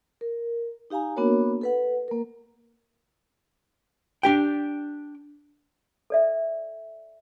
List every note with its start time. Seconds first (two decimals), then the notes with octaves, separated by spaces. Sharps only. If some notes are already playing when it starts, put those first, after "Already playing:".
0.21 A#4
0.90 D#4 G4 F5 G#5 A#5
1.16 A#3 B3 D4 F#4 A#4 C#5
1.61 A4 B4 F#5
2.08 A#3 A#4
4.23 D4 G4 G5
6.10 A4 D5 E5